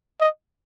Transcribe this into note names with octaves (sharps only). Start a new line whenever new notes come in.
D#5